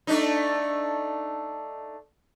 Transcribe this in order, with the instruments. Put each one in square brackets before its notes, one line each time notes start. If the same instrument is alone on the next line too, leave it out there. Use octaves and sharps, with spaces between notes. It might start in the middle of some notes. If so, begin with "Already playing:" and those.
[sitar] A3 D4 D#4